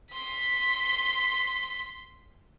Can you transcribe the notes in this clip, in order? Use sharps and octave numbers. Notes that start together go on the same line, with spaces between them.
C6 B6